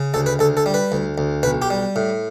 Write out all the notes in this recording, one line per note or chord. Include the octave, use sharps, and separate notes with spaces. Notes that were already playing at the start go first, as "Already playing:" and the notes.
Already playing: C#3
D2 A4
B4
D2 A4
A4
G3
B4
D2
D2
B1 B4
G4
G3
A2